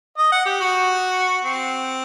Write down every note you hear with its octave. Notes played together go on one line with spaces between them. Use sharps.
D#5
F#5
G4
F#4
C4